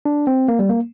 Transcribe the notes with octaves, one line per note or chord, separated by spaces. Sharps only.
D4
C4
A#3
G3
A#3